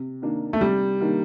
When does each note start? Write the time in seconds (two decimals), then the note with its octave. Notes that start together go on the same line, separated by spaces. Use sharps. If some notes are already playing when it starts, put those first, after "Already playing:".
Already playing: C3
0.22 D#3 A#3 D4
0.53 A3
0.61 C3 G3
1.01 D#3 A#3 D4